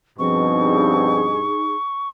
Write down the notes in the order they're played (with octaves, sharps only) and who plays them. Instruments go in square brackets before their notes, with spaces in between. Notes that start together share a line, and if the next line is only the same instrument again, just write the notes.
[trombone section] G2 B2 [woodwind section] F3 C4 [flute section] D#4 G#4 [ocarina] C#6